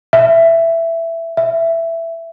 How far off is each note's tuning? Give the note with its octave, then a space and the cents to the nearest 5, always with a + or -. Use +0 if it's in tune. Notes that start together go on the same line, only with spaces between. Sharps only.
E5 +10
E5 +10